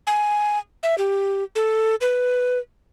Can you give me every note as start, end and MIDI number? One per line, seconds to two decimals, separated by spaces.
0.07 0.59 80
0.83 0.95 76
0.98 1.44 67
1.55 1.95 69
2.01 2.58 71